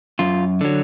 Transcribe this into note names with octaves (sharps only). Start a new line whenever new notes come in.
F#2 F4
D3 F#3